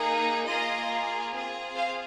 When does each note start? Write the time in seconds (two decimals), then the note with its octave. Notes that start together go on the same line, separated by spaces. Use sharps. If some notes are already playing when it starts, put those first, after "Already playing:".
Already playing: A#3 D#4 G#4
0.46 A#3 F4 G#4 D#5
1.32 C4 F4 G#4
1.75 C5 F5